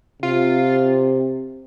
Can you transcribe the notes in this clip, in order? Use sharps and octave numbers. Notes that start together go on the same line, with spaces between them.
C3 F4